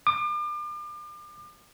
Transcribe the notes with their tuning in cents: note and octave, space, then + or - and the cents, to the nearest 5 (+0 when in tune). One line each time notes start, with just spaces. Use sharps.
D6 +40